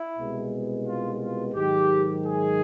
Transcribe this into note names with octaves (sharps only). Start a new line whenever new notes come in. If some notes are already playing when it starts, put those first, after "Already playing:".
Already playing: E4
C2 B2 G#3 B3
F4
F4
G#2 D#3 F#3 G4
G#4